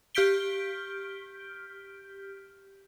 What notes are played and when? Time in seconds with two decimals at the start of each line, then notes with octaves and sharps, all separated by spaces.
0.15 G4 F6 G6 B6 D7 G7